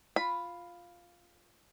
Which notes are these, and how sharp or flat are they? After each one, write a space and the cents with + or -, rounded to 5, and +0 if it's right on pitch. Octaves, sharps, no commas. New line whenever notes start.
F4 +0 B5 +5